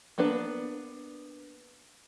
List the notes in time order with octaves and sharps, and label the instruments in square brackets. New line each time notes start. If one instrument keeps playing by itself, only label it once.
[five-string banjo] A#3 B3 D4 B4